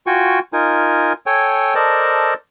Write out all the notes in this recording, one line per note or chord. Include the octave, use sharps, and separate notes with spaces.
F4 F#4 G5 G#5 C#6
D#4 F4 A#4 G#5
A4 C#5 G5 G#5
A4 A#4 C5 D5 D#5 A5